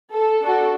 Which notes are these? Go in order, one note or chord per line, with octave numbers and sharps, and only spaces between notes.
A4
D4 F#4 A4